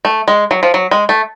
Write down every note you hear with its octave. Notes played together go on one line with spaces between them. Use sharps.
A3
G#3
F#3
F3
F#3
G#3
A3